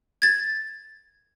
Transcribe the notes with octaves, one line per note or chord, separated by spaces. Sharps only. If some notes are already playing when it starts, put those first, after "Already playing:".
G#6 A6